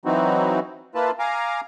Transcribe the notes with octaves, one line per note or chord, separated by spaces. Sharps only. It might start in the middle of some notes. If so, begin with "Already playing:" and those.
E3 F#3 C4 D#4 E4 F#4
A#3 E4 F4 B4 A5
F5 G#5 A#5 D6